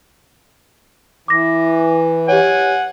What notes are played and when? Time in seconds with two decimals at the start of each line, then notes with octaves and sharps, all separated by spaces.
1.28 E3 D6 A#6
2.29 G4 C#5 F#5 G#5